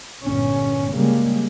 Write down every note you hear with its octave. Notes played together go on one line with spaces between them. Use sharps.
G1 A#2 C#4
C#3 G3 G#3 A#3